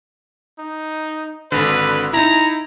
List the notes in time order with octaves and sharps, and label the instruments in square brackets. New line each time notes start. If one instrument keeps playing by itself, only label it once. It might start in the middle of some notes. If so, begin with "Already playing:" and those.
[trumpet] D#4
[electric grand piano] G#1 D3 [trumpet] B4
[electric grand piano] D#4 E4 [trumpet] A#5